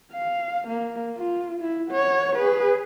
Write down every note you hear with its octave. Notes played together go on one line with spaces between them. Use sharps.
F5
A#3
F4
E4
C#5 F#5
G#4 B4